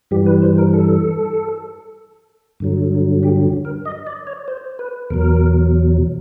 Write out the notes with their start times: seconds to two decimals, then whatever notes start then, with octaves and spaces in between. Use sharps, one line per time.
0.11 G2 E3 G3 G4
0.26 B4
0.42 C5
0.58 A#4
0.74 A4
2.60 G2 D3 F#3
3.23 G4
3.65 A#4
3.85 D#5
4.07 D5
4.27 C#5
4.48 C5
4.79 B4
5.10 E2 B2 F#3 A#4